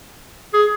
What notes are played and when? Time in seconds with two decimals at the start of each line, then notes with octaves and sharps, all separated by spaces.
0.54 G#4